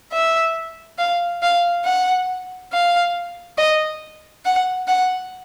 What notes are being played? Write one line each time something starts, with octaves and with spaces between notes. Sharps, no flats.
E5
F5
F5
F#5
F5
D#5
F#5
F#5